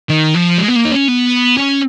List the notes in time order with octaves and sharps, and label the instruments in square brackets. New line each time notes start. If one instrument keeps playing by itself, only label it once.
[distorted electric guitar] D#3
F3
G#3
B3
A#3
D#4
C#4
B3
C#4